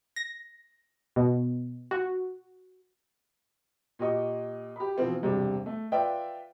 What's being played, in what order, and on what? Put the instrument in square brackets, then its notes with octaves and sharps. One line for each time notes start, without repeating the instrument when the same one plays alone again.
[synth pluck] A#6
B2
F#4
[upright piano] A#2 G4 D#5 C#6
G4 B5
B2 E3 F3 C4 F4
E1 G2 C3 G3
A3
F4 B4 D5 E5 G5